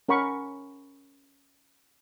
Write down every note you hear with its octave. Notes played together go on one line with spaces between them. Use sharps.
C#4 A#4 F#5 B5 C#6